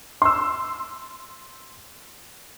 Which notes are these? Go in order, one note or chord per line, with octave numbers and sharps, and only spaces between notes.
C6 E6